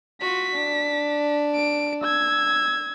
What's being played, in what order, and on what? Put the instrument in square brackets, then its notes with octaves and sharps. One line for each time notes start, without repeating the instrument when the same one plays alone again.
[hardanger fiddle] F4 F#4 [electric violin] B6
[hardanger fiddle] D4
[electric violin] D7
E6 G#6